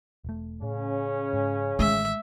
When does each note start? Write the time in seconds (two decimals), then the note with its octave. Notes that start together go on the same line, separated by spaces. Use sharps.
0.24 E1 A3
0.62 A2 C#3 C#4
1.33 G#2
1.79 A1 D#3 G#3 A3 E5